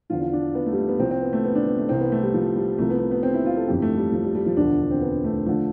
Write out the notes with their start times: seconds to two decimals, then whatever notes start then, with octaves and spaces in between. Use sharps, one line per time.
0.10 E2 D3 F3 F4
0.22 F4
0.33 D4
0.55 B3
0.66 A3
0.72 G3
0.78 A3
0.89 B3
0.99 C2 C3 F3 C4
1.11 C4
1.22 B3
1.33 A3
1.45 B3
1.55 D4
1.67 B3
1.78 A3
1.89 C2 C3 E3 C4
2.00 B3
2.12 A3
2.23 G3
2.34 F3
2.56 G3
2.78 C2 C3 F3 A3
2.90 B3
3.00 B3
3.11 B3
3.23 C4
3.34 E4
3.46 F4
3.57 A4
3.68 G1 F2 E3 G4
3.82 A3
3.97 G3
4.12 F3
4.23 G3
4.35 G3
4.46 F3
4.57 E1 D2 D3 F3 D4
4.91 C4
5.02 B3
5.24 A3
5.46 D3 F3 A3